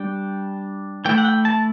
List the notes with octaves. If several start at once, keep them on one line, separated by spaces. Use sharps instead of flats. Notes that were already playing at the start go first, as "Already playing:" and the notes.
Already playing: G3 D4 G5
E3 A3 E4 G5
F#5
G5
A5